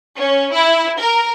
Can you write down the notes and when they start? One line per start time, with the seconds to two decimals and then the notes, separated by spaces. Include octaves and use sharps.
0.19 C#4
0.53 E4
1.00 A#4